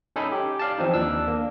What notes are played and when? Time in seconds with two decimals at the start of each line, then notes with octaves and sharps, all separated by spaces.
0.16 C#4 D#4 A4 G#5 B5 C6
0.32 G4
0.59 D5 F5 A5
0.78 E3 F3 C4 D#4
0.94 D#2 D4 E6
1.28 A#3